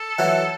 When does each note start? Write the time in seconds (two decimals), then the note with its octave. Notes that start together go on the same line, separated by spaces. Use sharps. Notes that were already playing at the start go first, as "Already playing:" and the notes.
Already playing: A4
0.19 E3 F#3